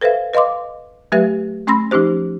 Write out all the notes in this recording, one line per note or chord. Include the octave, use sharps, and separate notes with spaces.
A4 B4 C5 E5 F5
B4 D#5 F5 C6 D6
F#3 A3 G4 B4 E5
A3 C#4 B5 C6 E6 A#6
F3 C#4 D#4 G4 C5